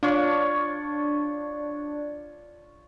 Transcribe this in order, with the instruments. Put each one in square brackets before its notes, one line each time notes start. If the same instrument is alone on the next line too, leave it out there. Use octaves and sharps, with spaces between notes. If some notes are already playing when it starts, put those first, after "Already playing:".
[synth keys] D4 [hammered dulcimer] F4 C#5